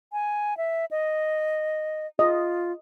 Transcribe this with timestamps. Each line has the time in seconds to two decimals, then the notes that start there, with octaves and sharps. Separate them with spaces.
0.13 G#5
0.57 E5
0.91 D#5
2.19 F4 D#5